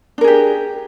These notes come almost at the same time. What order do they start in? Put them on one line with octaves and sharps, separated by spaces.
D4 A#4 G#4 G4